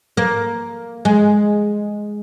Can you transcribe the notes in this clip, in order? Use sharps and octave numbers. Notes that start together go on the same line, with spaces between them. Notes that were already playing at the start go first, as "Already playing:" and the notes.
A#3
G#3